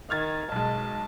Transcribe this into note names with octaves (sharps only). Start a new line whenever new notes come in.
D#3 F6 G#6 A6
B1 G#3 A5